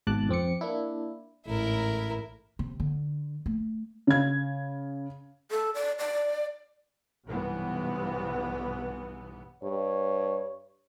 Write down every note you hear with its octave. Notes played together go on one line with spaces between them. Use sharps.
G#1 G#2 B2 A5 D6 F#6
F2 C4 D6 C#7
A#3 D4 E4
A1 G#2 E4 A#4
C3
D3
A3
C#3 G#6
A4
D5
D5
B1 G2 C3 E3 B3
G2 C#5